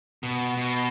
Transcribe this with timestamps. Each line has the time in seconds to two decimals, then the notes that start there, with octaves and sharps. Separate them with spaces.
0.23 B2
0.57 B2